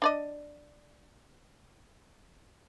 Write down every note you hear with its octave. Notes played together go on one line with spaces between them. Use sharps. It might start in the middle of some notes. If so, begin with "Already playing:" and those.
D4 D5 D#5